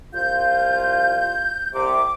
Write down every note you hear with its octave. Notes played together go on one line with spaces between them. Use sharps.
C2 F3 F4 G6
C2 C3 D6